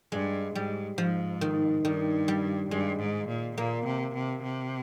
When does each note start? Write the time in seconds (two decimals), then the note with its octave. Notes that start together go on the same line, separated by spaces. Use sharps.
0.12 G2 G#3
0.55 G#2 G3
0.98 G#2 F3
1.41 D#3
1.84 G2 D#3
2.28 G3
2.70 G2 G#3
3.00 G#2
3.28 A#2
3.57 A#2 A#3
3.86 C3
4.14 C3
4.43 C3